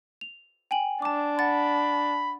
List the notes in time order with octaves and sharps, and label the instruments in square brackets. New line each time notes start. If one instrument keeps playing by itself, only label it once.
[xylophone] F7
G5 G#5 F#7
[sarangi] D4 [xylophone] A5 D6
[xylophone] F#5 A6 [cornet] B5